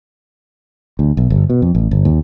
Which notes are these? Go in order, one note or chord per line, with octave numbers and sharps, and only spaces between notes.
D2
B1
G1
B2
F2
A1
G1
D#2